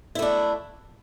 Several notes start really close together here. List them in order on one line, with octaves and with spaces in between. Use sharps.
E4 A3 D4